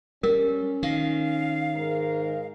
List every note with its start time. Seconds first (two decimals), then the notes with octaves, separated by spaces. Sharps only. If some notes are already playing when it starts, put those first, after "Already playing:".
0.23 G3 C#4 A#4
0.83 D#3 F5
1.73 G#2 A#4